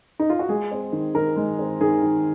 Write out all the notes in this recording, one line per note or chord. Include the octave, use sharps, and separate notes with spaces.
D#4
F4
F#4
G#3 G#4
C4
D#3
D#3 A#4
G#3
C4
D#3 G#4
D#3